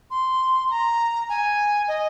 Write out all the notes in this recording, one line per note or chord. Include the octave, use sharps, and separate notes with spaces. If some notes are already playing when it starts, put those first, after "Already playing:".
C6
A#5
G#5
D#5